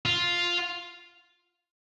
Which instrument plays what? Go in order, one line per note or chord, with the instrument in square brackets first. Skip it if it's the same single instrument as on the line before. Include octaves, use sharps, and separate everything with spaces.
[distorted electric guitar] F4